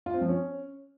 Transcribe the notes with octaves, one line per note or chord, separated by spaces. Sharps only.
F4
C4
F3
C#4